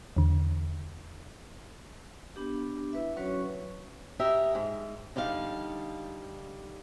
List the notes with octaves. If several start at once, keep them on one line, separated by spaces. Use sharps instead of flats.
E2 D3
B3 D4 G4
E4 B4 E5
F#3 C#4 F#4 B4 C#5 C#6
G4 A#4 D#5 E5
G#2
D3 G3 D#4 F5